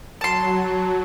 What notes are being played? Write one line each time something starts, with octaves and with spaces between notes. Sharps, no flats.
F#3 A5 C6